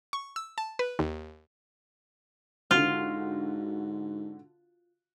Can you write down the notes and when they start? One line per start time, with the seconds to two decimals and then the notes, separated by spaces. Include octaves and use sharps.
0.13 C#6
0.36 E6
0.58 A5
0.79 B4
0.99 D#2
2.71 G#2 D3 F4 F#4